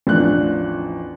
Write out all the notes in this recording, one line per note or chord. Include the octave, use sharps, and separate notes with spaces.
A1 E2 F3 D4 F#6